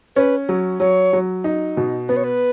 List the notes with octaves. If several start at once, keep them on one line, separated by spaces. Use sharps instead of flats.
C#4 B4
F#3
F#3 C#5
F#3
D#4
B2
B3 B4
C#5
B4